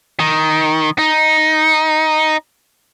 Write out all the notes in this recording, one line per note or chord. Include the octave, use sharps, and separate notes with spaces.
D#3
D#4